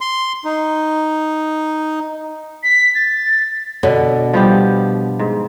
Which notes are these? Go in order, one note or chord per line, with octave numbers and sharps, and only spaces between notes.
C6
D#4
B6
A6
B2 D3 C#5
F3 G3 B3 G4
G#2